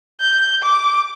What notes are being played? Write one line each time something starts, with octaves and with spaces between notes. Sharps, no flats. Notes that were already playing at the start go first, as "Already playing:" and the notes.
G6
D6